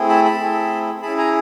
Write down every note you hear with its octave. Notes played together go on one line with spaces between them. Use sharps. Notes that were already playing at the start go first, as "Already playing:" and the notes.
Already playing: A3 C4 E4 G#4
A5 B5
A5 B5
A3 C4 E4 G#4
C#4 E4 G#4 A5 B5
G#5 A#5